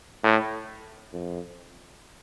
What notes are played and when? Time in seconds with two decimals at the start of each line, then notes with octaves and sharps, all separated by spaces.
0.24 A2
1.13 F2